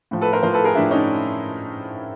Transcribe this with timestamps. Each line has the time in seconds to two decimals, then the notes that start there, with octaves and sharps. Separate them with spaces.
0.11 A2 F3
0.21 A4 B4
0.33 A#4 C5
0.43 A2 F3 A#4 C5
0.53 A4 B4
0.64 G#4 A#4
0.75 A2 F3 D4 E4
0.91 C#4 D#4